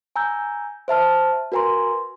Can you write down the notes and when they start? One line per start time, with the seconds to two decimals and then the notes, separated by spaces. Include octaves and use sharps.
0.16 G#5 A#5 E6 G6
0.88 C5 E5 A5 F6
1.52 F#4 A#4 B4 G#5 A#5 C6